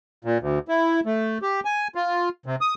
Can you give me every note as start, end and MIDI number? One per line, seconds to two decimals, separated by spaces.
0.25 0.38 46
0.40 0.59 38
0.68 1.00 64
1.06 1.38 57
1.42 1.60 67
1.65 1.88 80
1.95 2.29 65
2.46 2.56 48
2.61 2.74 87